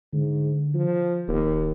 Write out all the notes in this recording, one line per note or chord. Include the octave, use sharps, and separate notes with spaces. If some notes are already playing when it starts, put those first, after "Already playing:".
G#2 D3
F3
D1 D#2